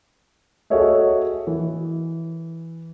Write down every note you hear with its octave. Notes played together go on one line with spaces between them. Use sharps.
F#4 G#4 A4 C#5 D#5 E5
E3